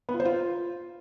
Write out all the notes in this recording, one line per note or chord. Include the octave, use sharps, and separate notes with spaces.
B3
F4
C5
F4